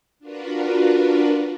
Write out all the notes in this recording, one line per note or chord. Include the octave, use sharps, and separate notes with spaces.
D4 F4 F#4 A#4 B4